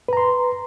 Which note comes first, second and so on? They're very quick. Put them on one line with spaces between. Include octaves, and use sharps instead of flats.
B4 A#5 C6